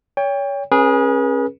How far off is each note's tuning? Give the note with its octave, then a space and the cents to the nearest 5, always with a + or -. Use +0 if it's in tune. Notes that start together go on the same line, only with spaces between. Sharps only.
C#5 +30 G5 +30
C#4 -30 G#4 +0 B4 -40